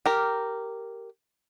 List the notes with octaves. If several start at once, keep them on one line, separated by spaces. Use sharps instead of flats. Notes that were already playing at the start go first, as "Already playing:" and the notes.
G4 A#4